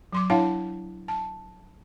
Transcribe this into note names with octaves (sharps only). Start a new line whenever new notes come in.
F#3 C6 D6
D4 E4 C#5 F5 F#5 A5
A5